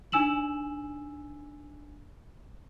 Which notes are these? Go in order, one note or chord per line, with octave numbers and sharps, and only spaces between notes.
D4 D#4 G#5 E6 E7 F#7